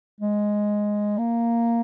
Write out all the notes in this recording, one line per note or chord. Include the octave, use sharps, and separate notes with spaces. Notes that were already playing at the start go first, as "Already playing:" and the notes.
G#3
A#3